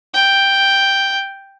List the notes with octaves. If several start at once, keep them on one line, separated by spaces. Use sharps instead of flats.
G5